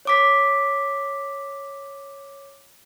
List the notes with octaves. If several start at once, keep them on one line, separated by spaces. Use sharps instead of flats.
C#5 D6 B6